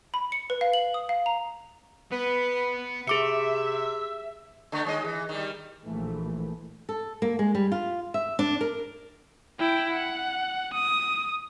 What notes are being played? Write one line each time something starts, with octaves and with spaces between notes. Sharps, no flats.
B5
C#7
B4
F5
F#7
D#6
F5
A#5
B3 B4
C3 G#4 E5 D6 C#7
D3 A3 B3
D#2 G#3 D#5
E3
D#3 G3
A#1 E3 A3
A4
A#3
G#3
G3
F4
E5
D4
A#4
E4 G5
F#5
D#6